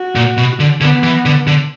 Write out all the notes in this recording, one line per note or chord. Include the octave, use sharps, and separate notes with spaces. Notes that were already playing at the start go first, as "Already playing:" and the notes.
Already playing: F#4
A#2
B2
D3
D3 B3
E3
D3
D3